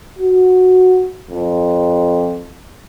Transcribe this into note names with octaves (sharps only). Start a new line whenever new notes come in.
F#4
F2